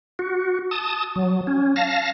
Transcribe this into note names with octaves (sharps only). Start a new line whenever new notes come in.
F#4
A5 D#6
F#3
C#4
F5 A5 A#6